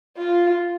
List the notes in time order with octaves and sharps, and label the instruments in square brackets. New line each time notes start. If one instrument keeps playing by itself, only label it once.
[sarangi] F4